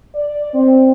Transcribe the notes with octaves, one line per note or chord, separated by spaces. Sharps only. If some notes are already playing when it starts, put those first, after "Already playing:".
D5
C4